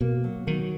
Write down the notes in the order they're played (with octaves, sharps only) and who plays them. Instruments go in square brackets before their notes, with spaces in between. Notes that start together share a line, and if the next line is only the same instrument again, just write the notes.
[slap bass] B2 [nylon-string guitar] A#3
[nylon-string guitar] F#3
[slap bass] D#3 [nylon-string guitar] F#3